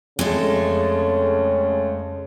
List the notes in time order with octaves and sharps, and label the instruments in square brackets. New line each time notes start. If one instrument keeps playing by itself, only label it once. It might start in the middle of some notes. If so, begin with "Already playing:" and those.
[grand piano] F2 [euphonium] C#3 [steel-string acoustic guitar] G#3 A3 A4